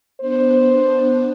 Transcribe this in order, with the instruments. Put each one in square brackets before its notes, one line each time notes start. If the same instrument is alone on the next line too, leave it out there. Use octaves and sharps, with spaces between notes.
[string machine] B3 D4 [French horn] C5